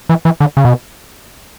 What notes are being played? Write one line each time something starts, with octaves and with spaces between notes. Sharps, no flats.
E3
E3
D3
C#3
B2